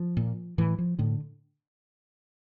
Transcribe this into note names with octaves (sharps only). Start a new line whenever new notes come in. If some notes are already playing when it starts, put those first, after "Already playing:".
Already playing: F3
A#2
A2 E3
F3
A2 D3